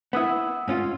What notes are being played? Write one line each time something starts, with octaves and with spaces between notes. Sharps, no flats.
B3 E4 F#5 D#6 E6
G#2 C#4 F4